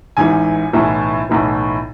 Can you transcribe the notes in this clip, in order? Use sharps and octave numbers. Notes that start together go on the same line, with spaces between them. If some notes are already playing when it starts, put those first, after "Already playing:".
A1 G#2 E3 G#5
B1 A2 E3
B1 A2 E3